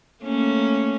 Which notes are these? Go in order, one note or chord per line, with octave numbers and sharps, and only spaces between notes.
A3 A#3 C#4